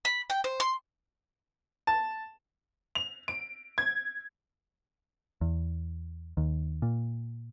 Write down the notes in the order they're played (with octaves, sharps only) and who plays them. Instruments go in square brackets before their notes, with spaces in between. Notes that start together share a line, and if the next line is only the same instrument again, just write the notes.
[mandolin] B5
G5
C5
C6
[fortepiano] A5
[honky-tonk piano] F7
D7
G#6
[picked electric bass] E2
D#2
A#2